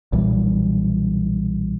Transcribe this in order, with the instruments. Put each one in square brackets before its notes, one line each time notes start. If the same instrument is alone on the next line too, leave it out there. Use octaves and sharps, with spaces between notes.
[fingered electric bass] B1 A#2 E3 G3